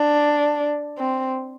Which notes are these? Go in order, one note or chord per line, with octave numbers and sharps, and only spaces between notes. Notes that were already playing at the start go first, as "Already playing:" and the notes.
Already playing: D4
C4